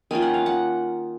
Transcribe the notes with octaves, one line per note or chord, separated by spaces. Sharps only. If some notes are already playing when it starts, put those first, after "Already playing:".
D#3 A#3 C#4 F4 G#5
F#5
F5
F#5